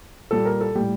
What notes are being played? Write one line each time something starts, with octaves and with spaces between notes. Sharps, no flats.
A#2 G3 A4
A#4
A4
A2 G3 G4